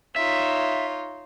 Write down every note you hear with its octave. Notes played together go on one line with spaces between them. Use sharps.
D#4 F4 C#5 E5